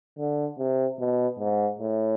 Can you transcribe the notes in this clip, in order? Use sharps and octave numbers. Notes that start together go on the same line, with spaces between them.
D3
C3
B2
G#2
A2